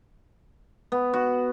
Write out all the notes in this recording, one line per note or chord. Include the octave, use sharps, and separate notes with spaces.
B3
F#4